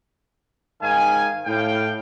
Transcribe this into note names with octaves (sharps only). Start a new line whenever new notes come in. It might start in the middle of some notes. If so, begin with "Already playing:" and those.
G#2 D#3 F5 G#5
A2 F5 G5